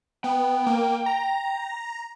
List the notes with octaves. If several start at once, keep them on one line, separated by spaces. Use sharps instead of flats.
B3 G5
A#3
A#5